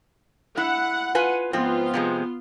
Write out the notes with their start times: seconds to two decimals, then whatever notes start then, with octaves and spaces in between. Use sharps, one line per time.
0.57 E4 F#5
1.15 F4 B4 G#5
1.53 G#2 F3 B3 C4 F4
1.94 C3 F3 G#3